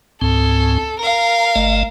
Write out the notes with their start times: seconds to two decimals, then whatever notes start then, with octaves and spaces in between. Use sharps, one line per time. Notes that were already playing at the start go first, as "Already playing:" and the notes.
0.21 C#2 G#2 C4 A4
0.99 A#4 F5 A#5
1.56 G1 A3 D#5